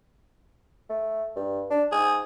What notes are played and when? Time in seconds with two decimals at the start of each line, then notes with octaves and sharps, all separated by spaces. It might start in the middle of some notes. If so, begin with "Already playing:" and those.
0.90 A3
1.36 G2
1.70 D4
1.91 G#2 G#4